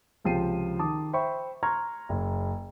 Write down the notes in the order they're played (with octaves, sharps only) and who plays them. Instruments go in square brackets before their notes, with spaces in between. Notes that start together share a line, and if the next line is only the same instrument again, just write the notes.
[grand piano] C#2 C3 F3 G5 C7 D#7
D#3 A5 D6 D#6
C5 E5 G5 B5 C#6
A#5 C6 C#6 F6 G#6
F#1 C#3